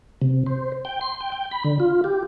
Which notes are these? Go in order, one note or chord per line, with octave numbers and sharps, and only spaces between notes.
C3
C5
G5
C6
G5
G5
B5
D3
F4
G4